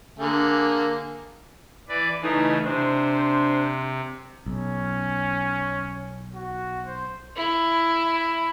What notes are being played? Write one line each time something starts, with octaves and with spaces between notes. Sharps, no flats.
D3 A#3 G#4
E3 B4 D5
C#3 E3 A3 D#4 G#4
C3 D4 C5
B1 C#4
F#4
C5
E4